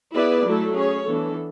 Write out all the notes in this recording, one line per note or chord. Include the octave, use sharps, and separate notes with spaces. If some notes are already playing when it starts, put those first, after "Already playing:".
B3 E4 G#4 B4 D5
F#3 A3 E4 A4
C#4 G#4 C#5
E3 B3 D4 A4